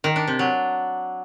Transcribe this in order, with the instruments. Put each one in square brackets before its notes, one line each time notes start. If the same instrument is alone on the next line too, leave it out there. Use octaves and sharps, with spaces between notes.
[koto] D#3
D4
C3
F#3